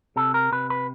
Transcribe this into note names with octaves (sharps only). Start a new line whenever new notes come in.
C3 A4
A#4
C3 B4
B4